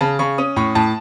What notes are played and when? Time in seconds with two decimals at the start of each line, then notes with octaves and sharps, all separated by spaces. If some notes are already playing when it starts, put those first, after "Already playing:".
0.01 C#3 A5
0.19 C#3 C#6
0.38 C#4 D#6
0.56 A2 C#6
0.75 A2 A5